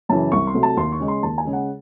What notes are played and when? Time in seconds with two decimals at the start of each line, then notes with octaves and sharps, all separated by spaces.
0.09 F#2 C#3 E3 A5
0.32 C2 C#6
0.47 C6
0.54 C3 F#3 A3
0.63 A5
0.77 D#2 C6
0.92 C#6
1.00 C#3 G#3
1.08 C6
1.23 D#2 A5
1.38 G#5
1.45 C#3 G#3
1.53 F#5